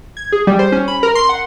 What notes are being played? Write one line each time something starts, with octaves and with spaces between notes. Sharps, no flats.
G#6
G#4
G3
C5
C#4
B5
A#4
C6
F#5